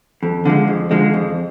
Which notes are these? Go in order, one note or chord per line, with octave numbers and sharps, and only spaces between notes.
F2
D3 F3 G#3
F2
D3 F3 G#3
F2